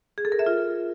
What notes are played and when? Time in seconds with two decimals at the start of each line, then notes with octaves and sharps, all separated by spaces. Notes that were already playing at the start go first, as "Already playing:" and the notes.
0.18 G#4
0.25 A4
0.32 A#4
0.39 E5
0.46 F4